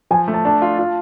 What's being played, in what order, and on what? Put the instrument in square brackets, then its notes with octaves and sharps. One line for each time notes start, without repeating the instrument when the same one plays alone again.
[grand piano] F3 [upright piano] G#5
[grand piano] A3
[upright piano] A5
[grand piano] D4 [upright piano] A5
[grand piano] F4
F4